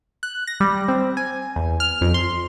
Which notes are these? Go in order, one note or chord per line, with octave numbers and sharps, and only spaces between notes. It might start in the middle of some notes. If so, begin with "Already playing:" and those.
F#6
A#6
G3
C4
G#5
E2
F6
F2
C6